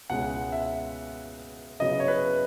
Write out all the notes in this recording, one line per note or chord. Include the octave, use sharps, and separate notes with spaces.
C#2 B2 G#3 C#4 E4 F#5
E5
C#3 F#3 B3 E4 D#5
C#5
B4